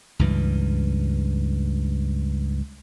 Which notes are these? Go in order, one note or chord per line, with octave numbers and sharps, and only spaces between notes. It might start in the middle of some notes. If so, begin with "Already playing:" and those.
C#2 G2 E3